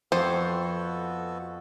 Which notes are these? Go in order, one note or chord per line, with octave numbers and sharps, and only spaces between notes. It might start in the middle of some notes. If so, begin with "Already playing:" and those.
F2 B3 F#4 A4 C5